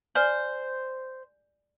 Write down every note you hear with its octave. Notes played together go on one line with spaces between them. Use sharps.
C5 D5 G#5 F6